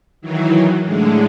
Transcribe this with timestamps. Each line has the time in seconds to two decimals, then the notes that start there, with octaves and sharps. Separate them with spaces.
0.21 D#3 E3 F#3
0.83 A2 D3 G#3